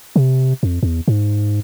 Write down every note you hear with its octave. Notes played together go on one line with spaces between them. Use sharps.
C3
F2
E2
G#2